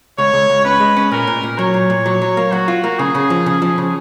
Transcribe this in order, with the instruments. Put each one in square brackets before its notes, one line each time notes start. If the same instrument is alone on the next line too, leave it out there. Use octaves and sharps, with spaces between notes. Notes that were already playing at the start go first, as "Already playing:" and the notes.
[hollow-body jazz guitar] C#2 [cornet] C#5
[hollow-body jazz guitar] C#2
C#2
[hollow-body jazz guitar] C#4 [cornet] B4
[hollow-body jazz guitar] G#3
C#4
[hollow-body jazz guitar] A#2 [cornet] A#4
[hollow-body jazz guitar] A#2
A#2
[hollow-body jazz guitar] F#3 [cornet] C#5
[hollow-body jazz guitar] A#2
A#2
F#3
F#3
A#3
[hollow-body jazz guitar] F#3 [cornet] F#4
[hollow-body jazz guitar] F4
A#3
[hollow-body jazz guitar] C#3 [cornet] G#4
[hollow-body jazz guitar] C#3
F3
C#3
F3
C#3